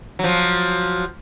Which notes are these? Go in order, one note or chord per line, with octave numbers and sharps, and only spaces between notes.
F3 F#3